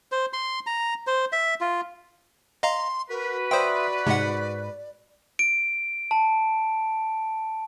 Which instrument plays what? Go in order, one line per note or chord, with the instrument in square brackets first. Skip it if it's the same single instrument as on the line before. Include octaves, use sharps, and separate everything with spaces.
[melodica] C5
C6
A#5
C5
E5
F4
[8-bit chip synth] D#5 F5 A#5 [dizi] C6
[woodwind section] F#4 B4 [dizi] A#4
[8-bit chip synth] C5 G5 [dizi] D5 [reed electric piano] E5 C6 D#6
[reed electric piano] G#2 [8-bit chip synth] C3 G#3 F#5
[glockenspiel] D7
A5